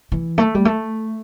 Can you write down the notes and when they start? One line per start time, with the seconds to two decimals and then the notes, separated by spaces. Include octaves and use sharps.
0.12 E3
0.38 A3
0.55 G3
0.65 A3